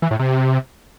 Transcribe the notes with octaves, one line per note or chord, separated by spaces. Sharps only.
E3
A2
C3